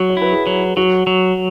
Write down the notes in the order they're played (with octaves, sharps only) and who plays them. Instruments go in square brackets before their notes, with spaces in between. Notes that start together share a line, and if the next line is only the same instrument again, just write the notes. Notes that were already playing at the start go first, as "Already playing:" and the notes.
Already playing: [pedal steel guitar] F#3 [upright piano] F#4
[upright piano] C#5
[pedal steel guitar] E4 [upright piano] B4
[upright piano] G#4
[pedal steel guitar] F#3
[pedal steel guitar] F#3 [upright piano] F#4
[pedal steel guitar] F#3